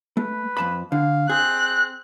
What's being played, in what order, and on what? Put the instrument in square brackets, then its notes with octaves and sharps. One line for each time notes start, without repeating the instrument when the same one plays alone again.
[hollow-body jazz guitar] A3 [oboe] B4
[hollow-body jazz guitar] F2 A5 B5
[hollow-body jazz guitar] D3 [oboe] F5
[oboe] C4 [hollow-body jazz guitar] G#4 [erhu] F#6